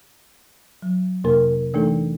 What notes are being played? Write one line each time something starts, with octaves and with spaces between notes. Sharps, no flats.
F#3
F2 C3 A#3 A#4
E3 A3 D4 D#4 A4